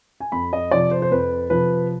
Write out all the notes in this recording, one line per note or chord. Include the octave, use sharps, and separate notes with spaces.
G#5
F2 B5
D#5
C3 F3 D5
C5
C5
F2 B4
C3 F3 B4